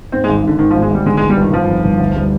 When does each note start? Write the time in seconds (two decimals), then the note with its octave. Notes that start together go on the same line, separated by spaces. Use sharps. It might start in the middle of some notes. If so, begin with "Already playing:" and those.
0.12 G#2 C4
0.24 G#3
0.28 G#1
0.43 G#1 D3
0.59 G#2 D#3
0.70 F3
0.74 G#1
0.82 G#3
0.90 G#1 G3
1.06 D3 G#3
1.17 G#3
1.21 G1
1.30 G3
1.37 G1 D#3
1.52 G1 F3
1.69 F2
1.85 G1
2.00 D2
2.16 G3